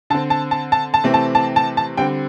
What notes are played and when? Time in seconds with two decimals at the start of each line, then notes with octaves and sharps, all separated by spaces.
0.10 D3 C4 A5
0.30 A5
0.51 A5
0.72 A5
0.94 A5
1.04 C3 E3 A3 C4
1.14 A5
1.35 A5
1.56 A5
1.77 A5
1.97 D3 G3 C4 G5